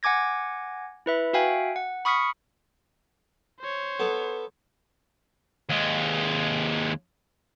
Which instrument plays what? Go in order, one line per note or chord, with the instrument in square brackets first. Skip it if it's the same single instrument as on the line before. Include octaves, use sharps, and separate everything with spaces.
[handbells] F#5 G#5 D6 G#6 A#6
E4 B4 E5
F#4 E5 F5 G5 G#5
F#5
B5 C#6 D#6 F6 B6 C#7
[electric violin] C5 C#5
[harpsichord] B3 A4
[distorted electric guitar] D#2 G#3